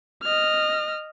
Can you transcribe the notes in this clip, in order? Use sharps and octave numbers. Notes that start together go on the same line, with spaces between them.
D#5 F6